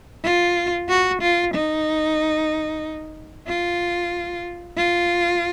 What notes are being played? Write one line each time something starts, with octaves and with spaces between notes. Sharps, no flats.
F4
F#4
F4
D#4
F4
F4